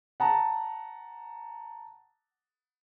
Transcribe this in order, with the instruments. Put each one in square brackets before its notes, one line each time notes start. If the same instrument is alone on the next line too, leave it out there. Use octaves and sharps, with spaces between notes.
[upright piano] F#5 A5 A#5